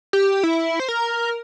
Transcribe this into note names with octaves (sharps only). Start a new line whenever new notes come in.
G4
E4
C5
A#4